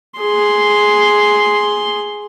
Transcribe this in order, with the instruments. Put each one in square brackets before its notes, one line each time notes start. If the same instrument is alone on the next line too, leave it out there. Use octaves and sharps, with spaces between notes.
[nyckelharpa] G#4 C6